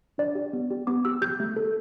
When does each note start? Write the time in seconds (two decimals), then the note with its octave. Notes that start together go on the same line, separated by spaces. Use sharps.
0.18 D4 D5
0.35 G4
0.53 B3
0.70 G4
0.87 B3 D6
1.05 G4 E6
1.22 G4 G6
1.40 A3
1.56 A4